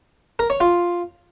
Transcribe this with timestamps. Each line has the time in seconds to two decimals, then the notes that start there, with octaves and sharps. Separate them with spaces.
0.39 A#4
0.50 C#5
0.61 F4